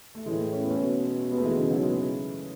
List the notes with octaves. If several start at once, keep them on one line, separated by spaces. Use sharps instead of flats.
A3
A2 E3 G#3
C#4
B3
A3 C#4
B2
G#3 B3
A3
E3 G#3
C#3 E3
D#3 F#3
E3 G#3